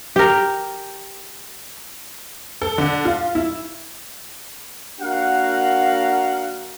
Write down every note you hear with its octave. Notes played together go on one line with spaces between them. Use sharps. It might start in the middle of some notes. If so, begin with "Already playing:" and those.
G4 A#4
A4
D3
F4
E4
A#3 D4 F#4 A#4 F5 F#5